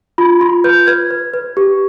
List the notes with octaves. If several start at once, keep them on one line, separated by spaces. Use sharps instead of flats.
F4 B5
F4 C6
B4 G6
B4 G#6
B4
B4
G4